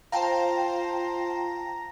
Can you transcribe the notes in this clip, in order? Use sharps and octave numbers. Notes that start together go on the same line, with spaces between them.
F4 C5 F5 G5 A5 A#5